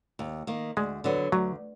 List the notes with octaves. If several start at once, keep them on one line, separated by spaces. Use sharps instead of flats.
D#2
D#3 A#3
D2 G#3
D3 F#3 B3
D2 F#3